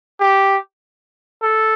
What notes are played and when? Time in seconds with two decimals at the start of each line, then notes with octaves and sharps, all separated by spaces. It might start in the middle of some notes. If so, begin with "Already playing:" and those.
0.20 G4
1.43 A4